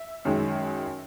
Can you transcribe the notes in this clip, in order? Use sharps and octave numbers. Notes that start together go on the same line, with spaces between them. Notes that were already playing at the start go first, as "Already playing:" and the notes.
Already playing: E5
F#2 D#3 G#3